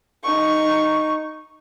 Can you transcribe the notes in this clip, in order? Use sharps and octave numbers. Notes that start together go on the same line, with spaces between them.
D#4 C#6